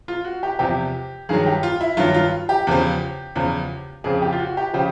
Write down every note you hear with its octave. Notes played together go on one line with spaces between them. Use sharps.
F4
F#4
G4
E2 C3 F3 G4
G2 D#3 F#3 G#4
G4
F4
E4
G2 D#3 F#3 F4
F4
G4
E2 C#3 F3
E2 C#3 F3
F2 C#3 F3 G#4
G4
F4
F#4
G4
C#3 F3 G4